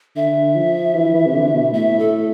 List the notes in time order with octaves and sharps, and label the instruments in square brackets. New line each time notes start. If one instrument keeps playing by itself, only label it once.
[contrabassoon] D3 [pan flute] E5
[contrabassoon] F3
E3
E3
C3
D3
B2
[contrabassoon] A2 [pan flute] E5
[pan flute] A4